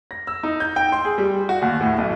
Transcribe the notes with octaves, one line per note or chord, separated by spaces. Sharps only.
A#6
E6
D#4
G6
G5
C6
G#4
G3
F#4
D#2
A2
B1